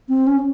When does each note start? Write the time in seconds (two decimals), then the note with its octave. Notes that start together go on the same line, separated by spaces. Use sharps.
0.09 C4
0.27 C#4